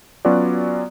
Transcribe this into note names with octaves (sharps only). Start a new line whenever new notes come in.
F#3 B3 C#4 F4 F#4 D5